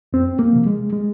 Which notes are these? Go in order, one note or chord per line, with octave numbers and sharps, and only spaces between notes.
F2 C4
A#3
C3 F3
G#3
G#3